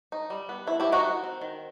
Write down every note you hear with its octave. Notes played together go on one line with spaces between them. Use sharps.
D#4
G3
B3
C4 E4
E4 G4
D#3
D#4 F#4
D#3
C4
D#3